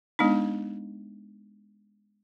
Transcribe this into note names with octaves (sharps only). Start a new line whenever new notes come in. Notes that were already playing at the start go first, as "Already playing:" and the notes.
G#3 B3 D4 D#4